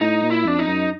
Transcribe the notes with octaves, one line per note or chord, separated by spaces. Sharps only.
A2 D#4
A#2
E4
F2 D4
D#4
F#2